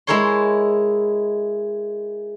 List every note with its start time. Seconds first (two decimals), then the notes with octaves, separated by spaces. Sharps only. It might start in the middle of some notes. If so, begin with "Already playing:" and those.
0.07 G#3 E4 G#4 A#4 C#5 C6